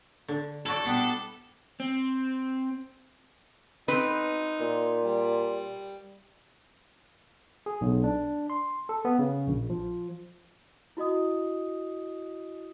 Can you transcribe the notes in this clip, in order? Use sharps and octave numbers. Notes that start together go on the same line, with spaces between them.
D3
E4 F#4 A4 D5
G3 B3 D4
C4
C4 D#4 B4
A#2
G3
G#4
B1
D4
C6
A4
B3
C#3
A#1
F3
E4 F#4 D#5 D#6